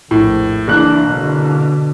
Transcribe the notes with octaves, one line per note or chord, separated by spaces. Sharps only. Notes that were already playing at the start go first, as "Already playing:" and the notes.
A#1 F2 A2
F#1 E3 D4 F#6
B2 D3